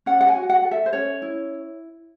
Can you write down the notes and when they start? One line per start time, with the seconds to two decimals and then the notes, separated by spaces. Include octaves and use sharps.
0.06 C#4 F#5
0.21 F#5
0.28 G#5
0.36 F#4
0.49 F#5
0.64 A4
0.71 E5
0.86 C5
0.93 C#4 C#5
1.22 E4